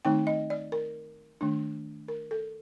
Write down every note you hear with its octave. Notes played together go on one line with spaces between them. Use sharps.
D#3 A3 C4 D#4 G5
D#5
D5
A#4
D#3 A3 D4
A#4
A4